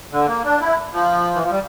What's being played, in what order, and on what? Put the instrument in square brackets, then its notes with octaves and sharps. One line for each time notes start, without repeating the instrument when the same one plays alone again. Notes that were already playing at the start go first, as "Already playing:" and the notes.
[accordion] D3
A#3
D4
E4
F3
E3
F3
G3